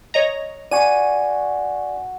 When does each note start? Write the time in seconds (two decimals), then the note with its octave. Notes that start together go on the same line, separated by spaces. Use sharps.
0.14 C#5 D#5 A#5
0.71 F#4 D5 G#5 C#6 D#7